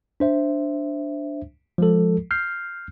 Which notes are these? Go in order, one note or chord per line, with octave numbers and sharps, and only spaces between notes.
D4 C5 E5
F3 G#3 A4
F6 G6 C7